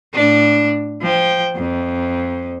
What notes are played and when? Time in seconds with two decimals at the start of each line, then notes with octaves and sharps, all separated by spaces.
0.14 A2 D4
1.02 F3 G5
1.56 F2